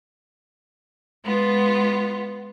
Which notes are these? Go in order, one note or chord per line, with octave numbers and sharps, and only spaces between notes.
G#3 B3 F4